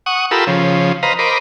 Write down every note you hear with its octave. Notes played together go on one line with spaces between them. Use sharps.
F#5 C#6 D#6
F4 G4 A4 A#4 B5 E6
C#3 F3
B4 C5 D#5 F5 A#5
A#4 C5 D#5 B5 D6